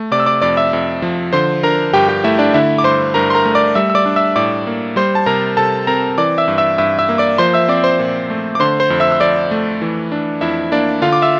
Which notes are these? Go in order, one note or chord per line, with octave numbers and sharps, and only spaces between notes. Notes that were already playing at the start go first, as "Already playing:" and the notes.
Already playing: A3
C3 D5 D6
E6
D5 D6
F2 D5 D6
E5 E6
F2
F3
D3 C5 C6
D4 A#4 A#5
G2 G4 G5
G4 G5
A3 E4 E5
D4 D5
D3 E4 E5
D6
G2 C5 C6
G2 A#4 A#5
C6
A#4 A#5
A3
D5 D6
G3 E5 E6
E6
D5 D6
D4
E5 E6
A2 D5 D6
A#3
G3 C5 C6
A5
C3 A#4 A#5
C3 A4 A5
C4 A#4 A#5
E3 D5 D6
E5 E6
G2
E5 E6
G2 E5 E6
E5 E6
A#3
D5 D6
F3 C5 C6
E5 E6
C4 D5 D6
C5 C6
A#2
A3
D6
D3 C5 C6
C5 C6
F2
E5 E6
E6
F2 D5 D6
A3
E3
D4
F2 E4 E5
A#3 D4 D5
D3 F4 F5
D6
E5 E6